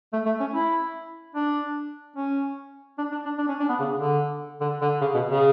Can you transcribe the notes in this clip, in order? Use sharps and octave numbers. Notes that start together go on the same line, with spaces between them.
A3
A3
C#4
E4
D4
C#4
D4
D4
D4
D4
C#4
D4
B3
C#3
D3
D3
D3
C#3
B2
C#3